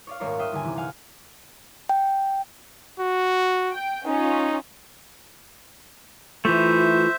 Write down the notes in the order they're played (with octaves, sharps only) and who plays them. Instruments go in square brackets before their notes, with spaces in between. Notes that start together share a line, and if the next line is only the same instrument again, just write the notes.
[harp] C#5 D5 F5
D#1 G#1 A#4 C#5 D5 C6
E5 G5 C6 D#6 F6 F#6
G1 D#2 D3 G#5
C3 E3
F5 F#5 G#5 F6
[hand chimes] G5
[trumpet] F#4
[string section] G5
[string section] C#4 F4 [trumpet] D#4
[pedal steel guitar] E3 A3 [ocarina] F4 [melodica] C5 E5